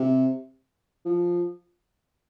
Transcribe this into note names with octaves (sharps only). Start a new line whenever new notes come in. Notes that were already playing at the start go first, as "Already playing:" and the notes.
Already playing: C3
F3